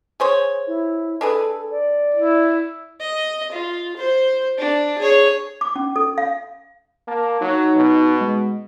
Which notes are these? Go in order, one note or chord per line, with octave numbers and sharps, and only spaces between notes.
G#4 C5 C#5
E4
D4 G#4 A4 B4
D5
E4
D#5
F4
C5
D4
G#4 C#5
D6
C#4
A4
F5
A#3 A5
F#3 D#4
B2
G#3